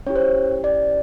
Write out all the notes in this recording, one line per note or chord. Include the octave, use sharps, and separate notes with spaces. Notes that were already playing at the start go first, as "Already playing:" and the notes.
C#4 E4 G4 C#5
C5
C#5
D5